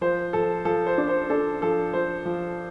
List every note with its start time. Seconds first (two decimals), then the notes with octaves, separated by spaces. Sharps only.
0.01 F3 C5
0.33 F3 A4
0.65 F3 A4
0.87 C5
0.98 D4
1.08 C5
1.30 D4 A4
1.62 F3 A4
1.93 F3 C5
2.25 F3